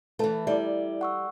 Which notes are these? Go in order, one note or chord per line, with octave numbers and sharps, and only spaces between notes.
E3 A3 B4 A5
G3 E4 D5 E5
F#5 C#6 E6